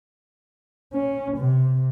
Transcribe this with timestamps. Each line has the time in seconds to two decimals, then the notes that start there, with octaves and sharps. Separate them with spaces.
0.93 C#4
1.37 C3